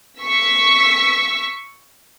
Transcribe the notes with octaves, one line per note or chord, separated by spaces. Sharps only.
C#6 E6 B6